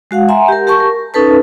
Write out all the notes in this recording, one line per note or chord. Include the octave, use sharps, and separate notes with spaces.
G#3 F#4 F5 F#5
E5 F#5 G#5 A#5 C6
G4 A#4
G4 A#4 A5 C#6
A#4
C#4 D#4 A4 B4 A5